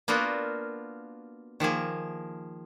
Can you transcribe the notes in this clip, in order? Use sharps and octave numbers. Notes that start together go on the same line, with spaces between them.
A#3 B3 D4 F4 F#4 A#4
D#3 F3 A#3 G#4